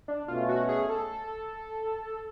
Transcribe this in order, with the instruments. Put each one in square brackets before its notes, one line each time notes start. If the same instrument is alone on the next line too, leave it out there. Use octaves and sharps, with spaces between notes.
[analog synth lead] D4
[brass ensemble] B2 A3 C#4 [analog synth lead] F4
[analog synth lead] F#4
G#4
A4